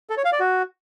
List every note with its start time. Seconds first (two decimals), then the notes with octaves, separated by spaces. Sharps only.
0.10 A4
0.17 C#5
0.25 F5
0.32 D5
0.40 F#4